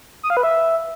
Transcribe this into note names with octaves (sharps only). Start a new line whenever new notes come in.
D#6
F5
B4
E5